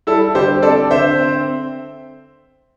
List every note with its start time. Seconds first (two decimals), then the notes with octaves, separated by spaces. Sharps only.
0.07 G3 E4 A4
0.35 D3 G4 C5
0.62 C4 A4 D5
0.91 D3 C5 E5
1.19 C4